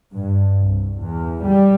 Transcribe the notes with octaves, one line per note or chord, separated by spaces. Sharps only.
G2
C2
E2
G3